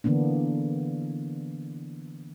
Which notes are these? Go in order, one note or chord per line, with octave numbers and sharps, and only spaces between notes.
D3 E3 A#3 B3 D4